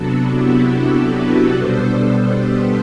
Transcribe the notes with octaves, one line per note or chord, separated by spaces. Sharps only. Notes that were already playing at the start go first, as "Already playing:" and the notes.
Already playing: C3 F#3 B3 D4 F#4 A4
E4 G4
F#4 A4
G4 B4
B2 G3 B3 D4 A4 C5
A4 C5
G4 B4